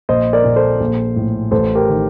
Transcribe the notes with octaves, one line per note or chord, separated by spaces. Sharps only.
A#1 C5 D#5
A#4 D5
A#2
A4 C5
A#1
A2
A1 A4 C5
G4 A#4
D#3